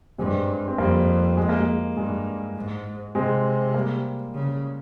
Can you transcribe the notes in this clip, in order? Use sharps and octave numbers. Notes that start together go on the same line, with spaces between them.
G2 G#3 C4
C4
F2 G3 A#3
G#3
A#3
G#3
G2 G#3
G#2
C3 G#3 C4
G3 A#3
C#3